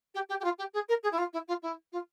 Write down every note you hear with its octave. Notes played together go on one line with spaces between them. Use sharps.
G4
G4
G4
F4
G4
G#4
A#4
G#4
E4
F4
E4
F4
E4
F4